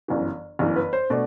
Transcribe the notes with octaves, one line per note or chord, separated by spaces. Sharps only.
G1 F#2 E3
G1 F#2 E3
B4
C5
B2 A3 D4 D5